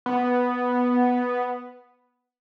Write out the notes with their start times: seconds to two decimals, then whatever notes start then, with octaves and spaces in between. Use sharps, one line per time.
0.06 B3